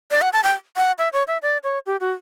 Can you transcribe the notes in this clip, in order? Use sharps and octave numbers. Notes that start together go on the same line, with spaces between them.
D5
F#5
A5
G5
F#5
E5
C#5
E5
D5
C#5
G4
F#4